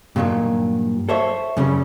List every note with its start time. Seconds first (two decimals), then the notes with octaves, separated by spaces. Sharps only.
0.16 G2 A#2 D#3 E3 F#3
1.09 A4 C5 C#5 E5
1.57 F#2 C#3 G3 C#4